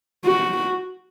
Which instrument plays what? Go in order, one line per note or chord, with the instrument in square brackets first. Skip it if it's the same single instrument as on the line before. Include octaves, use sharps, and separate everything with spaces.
[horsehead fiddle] F#4